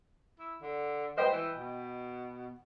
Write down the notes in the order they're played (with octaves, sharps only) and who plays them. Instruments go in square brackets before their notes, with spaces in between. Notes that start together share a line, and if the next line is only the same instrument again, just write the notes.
[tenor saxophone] E4
D3
[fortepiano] B4 D#5 G5 [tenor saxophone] C5
[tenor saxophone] E3
B2